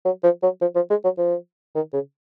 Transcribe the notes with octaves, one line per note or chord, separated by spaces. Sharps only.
F#3
F3
F#3
F3
F3
G#3
F#3
F3
D#3
C#3